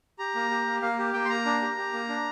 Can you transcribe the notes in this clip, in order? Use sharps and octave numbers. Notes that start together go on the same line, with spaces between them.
G4 A#5
A#3
G4
A#3
A#3 F5
G4
A#3 G5
C6
A#3 A#5
D4
G4
G4
A#3
D4